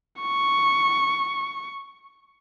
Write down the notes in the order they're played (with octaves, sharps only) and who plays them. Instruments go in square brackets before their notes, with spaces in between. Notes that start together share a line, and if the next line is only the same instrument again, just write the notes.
[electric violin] C#6